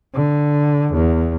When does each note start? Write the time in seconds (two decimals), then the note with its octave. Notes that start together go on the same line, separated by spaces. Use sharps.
0.14 D3
0.93 E2